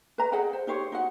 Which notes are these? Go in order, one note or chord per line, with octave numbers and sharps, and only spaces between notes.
B4 A#5
G#4 D#5 F#5 G5
C5
D#4 G4 C5 C#5
D#4 F#4 F#5